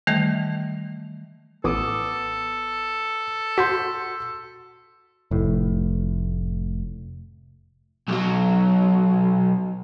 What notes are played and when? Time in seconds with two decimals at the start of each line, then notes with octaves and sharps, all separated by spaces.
0.07 D#3 E3 G3 A3
1.64 A1 B3 A4 D6 D#6
3.58 F#4 C6 G6 B6
5.31 F1 A2
8.08 B1 F#3